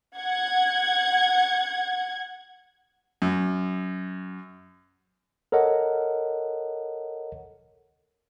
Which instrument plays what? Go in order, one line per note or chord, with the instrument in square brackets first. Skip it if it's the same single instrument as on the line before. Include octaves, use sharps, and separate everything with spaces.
[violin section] F#5 G#6
[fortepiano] F#2
[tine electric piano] A4 A#4 C#5 D#5 F#5